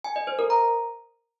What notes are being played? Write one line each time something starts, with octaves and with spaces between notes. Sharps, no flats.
G#5
D#5
C5
A#4
A#5